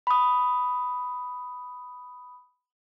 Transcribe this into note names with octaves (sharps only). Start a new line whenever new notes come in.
B5 D#6